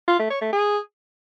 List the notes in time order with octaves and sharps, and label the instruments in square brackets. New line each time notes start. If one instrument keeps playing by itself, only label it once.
[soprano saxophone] F4
A3
C#5
A3
G#4